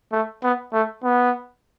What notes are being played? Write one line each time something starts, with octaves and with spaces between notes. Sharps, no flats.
A3
B3
A3
B3